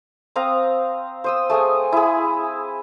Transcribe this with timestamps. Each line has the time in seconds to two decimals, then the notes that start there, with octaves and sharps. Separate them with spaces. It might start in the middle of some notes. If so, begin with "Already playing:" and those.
0.36 C4 F5 A#5 D#6
1.24 C5 D#6 E6
1.50 A3 G#4 G#5 D#6
1.92 E4 G#4